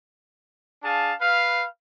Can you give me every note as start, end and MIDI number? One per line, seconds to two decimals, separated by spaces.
0.83 1.13 62
0.83 1.13 68
0.83 1.13 77
0.83 1.13 81
1.21 1.65 71
1.21 1.65 77